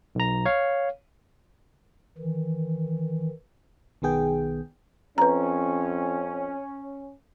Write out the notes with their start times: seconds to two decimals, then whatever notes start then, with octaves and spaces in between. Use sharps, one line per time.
0.15 B1 A#5
0.46 C#5 F5
2.18 D#3 E3
4.02 B1 D#3 B3 G#4 G5
5.18 F2 C#4 B4 A#5